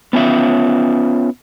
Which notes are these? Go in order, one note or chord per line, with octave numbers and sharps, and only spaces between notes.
B3 C#4 F4 E5